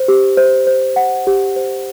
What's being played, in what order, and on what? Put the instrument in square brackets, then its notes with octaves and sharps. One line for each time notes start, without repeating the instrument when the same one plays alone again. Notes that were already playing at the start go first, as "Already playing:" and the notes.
Already playing: [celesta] C5
G4
C5
C5
F#5
G4
C5